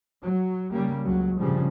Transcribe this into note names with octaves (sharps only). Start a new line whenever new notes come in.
F#3
C#3 G3 A#3
C#2 F#3
G2 A#2 C#3 F3 G3